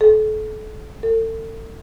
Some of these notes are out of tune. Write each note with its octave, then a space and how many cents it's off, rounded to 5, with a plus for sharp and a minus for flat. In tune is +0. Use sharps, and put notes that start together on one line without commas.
A4 -35
A4 +35